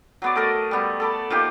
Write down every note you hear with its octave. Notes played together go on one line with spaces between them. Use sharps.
F#3 B3 D5
A3 A4 A#4 D#5
G3 B3
A4 D5 B5
F3 A#3 D#4 G4